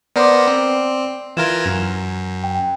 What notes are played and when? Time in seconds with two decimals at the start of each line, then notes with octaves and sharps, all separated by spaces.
0.16 B3 A#4 C5 D5 C6 D6
0.47 C4
1.37 E3 F4 A#4 G#6 E7
1.65 F#2 A#6
2.44 G5